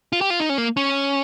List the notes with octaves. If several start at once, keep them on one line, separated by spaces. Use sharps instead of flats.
F4
G4
F4
D#4
C#4
A#3
C#4